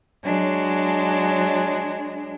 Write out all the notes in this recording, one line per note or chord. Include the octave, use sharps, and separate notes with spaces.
F#3 G#3 D4